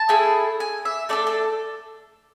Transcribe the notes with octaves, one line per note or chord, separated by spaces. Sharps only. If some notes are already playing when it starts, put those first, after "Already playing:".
Already playing: A5
A3 E4 G#4
G#5
E5
A3 D4 A4 D5
A4